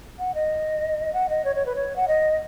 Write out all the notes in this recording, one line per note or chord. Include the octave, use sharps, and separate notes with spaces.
F#5
D#5
F#5
D#5
C#5
C#5
B4
C#5
F#5
D#5